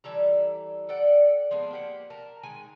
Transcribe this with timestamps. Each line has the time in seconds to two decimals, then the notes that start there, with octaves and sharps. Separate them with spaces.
0.04 E3 G3 A4 A#5
0.89 A4 D5 F#5 G5
1.51 F3 G#3 B3 D4
1.71 A#3 G4 F#5
2.10 A#4 A5
2.43 D#3 G#3 G#5